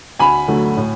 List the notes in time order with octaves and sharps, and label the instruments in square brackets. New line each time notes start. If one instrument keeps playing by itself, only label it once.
[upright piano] D2 G#5 B5
D3 F#3 A3
A2